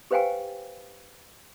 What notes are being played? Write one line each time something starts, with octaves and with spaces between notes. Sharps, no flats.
G4 B4 C5 F5 G5 G#5